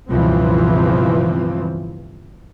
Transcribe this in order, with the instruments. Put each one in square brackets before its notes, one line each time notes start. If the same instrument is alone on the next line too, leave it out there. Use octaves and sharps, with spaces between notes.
[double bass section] C#2 G2 B2 E3 F3 C4